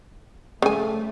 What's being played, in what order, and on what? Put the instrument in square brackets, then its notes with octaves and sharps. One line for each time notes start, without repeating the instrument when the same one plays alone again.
[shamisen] C#3 G#5 [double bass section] A3